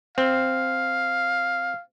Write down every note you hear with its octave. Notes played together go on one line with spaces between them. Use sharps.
C4 F5